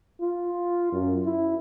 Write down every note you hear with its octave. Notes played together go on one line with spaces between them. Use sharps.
F4
F#2
E4